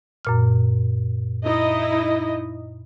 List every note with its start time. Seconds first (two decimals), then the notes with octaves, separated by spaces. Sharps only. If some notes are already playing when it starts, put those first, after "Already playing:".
0.25 F#2 A#2 F6
1.45 D#4 E4 D#5